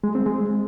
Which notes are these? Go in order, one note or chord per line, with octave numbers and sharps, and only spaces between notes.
G#3
C4
G#3